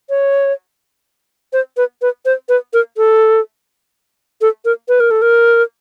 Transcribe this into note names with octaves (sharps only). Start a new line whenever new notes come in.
C#5
C5
B4
B4
C5
B4
A#4
A4
A4
A#4
B4
A#4
A4
A#4